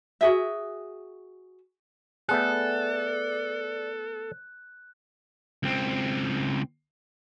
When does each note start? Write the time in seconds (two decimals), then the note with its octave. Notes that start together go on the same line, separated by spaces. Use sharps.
0.21 F#4 G#4 E5
2.29 A3 B3 G#4 A4 D5 F#6
5.63 C#2 C4